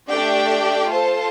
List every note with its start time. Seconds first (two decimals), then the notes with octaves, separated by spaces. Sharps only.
0.10 A3 D4 G4 D5 G5
0.88 F4 A4 C5 A5